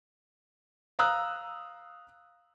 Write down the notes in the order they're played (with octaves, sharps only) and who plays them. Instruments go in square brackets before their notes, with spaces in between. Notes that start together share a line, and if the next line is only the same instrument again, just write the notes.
[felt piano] F5 A#5 D#6 E6 F#6